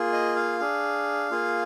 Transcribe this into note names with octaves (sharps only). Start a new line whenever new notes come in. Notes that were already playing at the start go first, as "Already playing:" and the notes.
Already playing: A#3 F4 G#4
D#5
F5
D4 G#4
A#3 F4 G#4